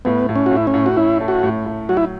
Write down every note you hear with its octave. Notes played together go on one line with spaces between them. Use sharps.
A2 B3
A2
C#4
F#4
A2
E4
C#4
A2
F#4
C#4 E4
A3
F#4
A2
A2
F#3 F#4
E4